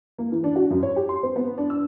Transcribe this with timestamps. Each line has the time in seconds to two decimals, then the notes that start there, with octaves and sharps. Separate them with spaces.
0.18 A#3
0.32 E3
0.44 D4
0.56 F#4
0.71 F#2
0.83 C#5
0.96 G4
1.09 C6
1.23 C4
1.36 B3
1.58 D4
1.70 E6